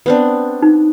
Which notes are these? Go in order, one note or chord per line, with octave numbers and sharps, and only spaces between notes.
B3 C4 D4
D#4